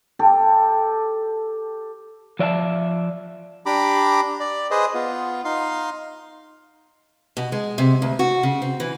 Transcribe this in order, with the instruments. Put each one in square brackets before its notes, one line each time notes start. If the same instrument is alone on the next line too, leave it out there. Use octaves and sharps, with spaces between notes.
[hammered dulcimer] G4 A4
[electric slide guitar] F3 D5 E5 F5 A5
[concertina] D4 G4 A#5 B5 D6
D5
G#4 B4 C5 D#5
B3 F4
D#4 F5 C6
[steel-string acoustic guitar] B2
G#3
C3
D2
F#4
C#3
C4
E3